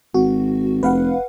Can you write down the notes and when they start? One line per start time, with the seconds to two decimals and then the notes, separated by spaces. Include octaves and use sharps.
0.14 G#1 F#4
0.83 F1 B4 F5 F#5